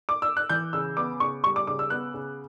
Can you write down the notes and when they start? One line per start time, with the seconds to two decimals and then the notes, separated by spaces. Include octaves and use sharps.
0.09 D6
0.22 E6
0.37 F#6
0.49 E3 G6
0.73 C#3 E6
0.97 B3 D6
1.20 C#3 C#6
1.44 G3 C#6
1.56 D6
1.67 C#3 D6
1.79 E6
1.90 B3 F#6
2.14 C#3